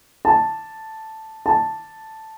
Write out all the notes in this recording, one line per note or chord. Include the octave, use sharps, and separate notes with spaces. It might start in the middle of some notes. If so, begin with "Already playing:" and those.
A5
A5